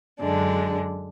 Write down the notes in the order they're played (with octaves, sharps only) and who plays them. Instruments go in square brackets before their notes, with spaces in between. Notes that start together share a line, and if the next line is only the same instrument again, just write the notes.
[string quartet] F#2 D3 G#3 D4